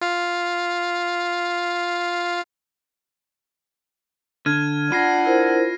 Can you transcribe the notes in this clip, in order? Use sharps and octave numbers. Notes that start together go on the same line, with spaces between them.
F4 F5
D3 F6 G#6 D#7
D4 F4 F#5 B5 A#6 C7 D#7
E4 A#4 C5